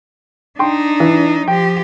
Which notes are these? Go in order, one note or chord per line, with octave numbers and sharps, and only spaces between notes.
D4 D#4 G5 C6
E3
F3 G4 G5